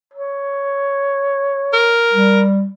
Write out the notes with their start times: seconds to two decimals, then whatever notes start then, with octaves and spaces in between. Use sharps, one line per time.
0.14 C#5
1.73 A#4
2.13 G3